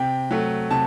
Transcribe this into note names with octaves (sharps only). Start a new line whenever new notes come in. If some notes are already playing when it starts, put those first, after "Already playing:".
Already playing: C3 G5
F#3 A3
C3 A5